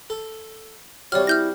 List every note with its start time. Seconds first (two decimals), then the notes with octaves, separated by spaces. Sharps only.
0.10 A4
1.12 C3 G3 F#4 C#5 D5 F6
1.27 E4 F6 G6 A#6